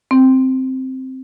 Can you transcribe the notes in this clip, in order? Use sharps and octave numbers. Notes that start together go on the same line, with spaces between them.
C4